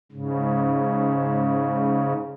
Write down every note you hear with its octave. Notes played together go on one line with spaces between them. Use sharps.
G#2 C#3